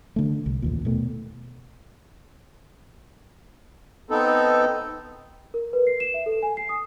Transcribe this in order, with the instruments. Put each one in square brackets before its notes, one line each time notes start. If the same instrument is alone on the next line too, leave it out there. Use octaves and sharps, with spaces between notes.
[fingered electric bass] D3 A3
C2
A1 D#2 A#2
B2 A3
[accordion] B3 C4 D#4 A4
[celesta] A#4
B4
C7
E7
E5
A4
G#5
C7
D#6